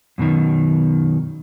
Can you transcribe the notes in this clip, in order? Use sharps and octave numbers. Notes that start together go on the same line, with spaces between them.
F#2 B2 D3 D#3